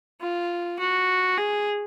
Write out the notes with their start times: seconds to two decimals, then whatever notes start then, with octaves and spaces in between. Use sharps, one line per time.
0.21 F4
0.79 F#4
1.37 G#4